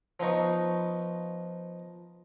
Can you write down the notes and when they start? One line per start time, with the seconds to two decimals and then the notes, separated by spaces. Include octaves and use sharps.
0.20 F3 B3 D#4 C#6